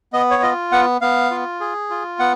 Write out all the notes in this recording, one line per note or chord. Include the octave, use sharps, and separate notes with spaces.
B3 D#5
C#5
F4 D#5
B3 F#5
B3 F5
F4
G#4
F4
B3 F#5